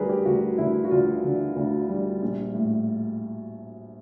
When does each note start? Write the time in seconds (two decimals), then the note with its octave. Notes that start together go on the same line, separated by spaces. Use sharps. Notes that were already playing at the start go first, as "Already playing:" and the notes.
Already playing: D2 G3 G#4 A#4 B4
0.09 G4
0.25 D2 F#4
0.58 D2 E4
0.84 F#4
0.91 D2 F4
1.24 D3
1.56 D2
1.89 G3
2.22 A#1
2.54 A2